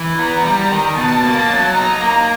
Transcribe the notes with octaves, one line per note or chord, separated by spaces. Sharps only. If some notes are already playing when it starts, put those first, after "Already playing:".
Already playing: E3
B3 A#5
G3
D#3
B2 A5
A#3
F#3
D#4 A#5
A#3